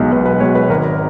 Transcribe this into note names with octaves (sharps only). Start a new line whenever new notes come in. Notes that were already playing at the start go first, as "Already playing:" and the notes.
Already playing: B1 B2 G#3
B1 B4
B4
B2 G#3 C#5
B4
G#1 A#4